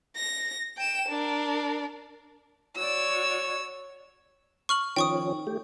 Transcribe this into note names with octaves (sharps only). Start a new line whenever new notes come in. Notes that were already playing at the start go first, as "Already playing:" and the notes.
A#6
G5 E7
D4 A#4
F#4 C#5 D5 E6
C#6 F6 F#7
D#3 F3 C#4 G5 C#6 D#6
A3 G4